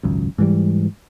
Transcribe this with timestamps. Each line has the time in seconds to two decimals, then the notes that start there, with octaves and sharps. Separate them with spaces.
0.03 G#1 C#2 F#2
0.38 G#2 E3 G3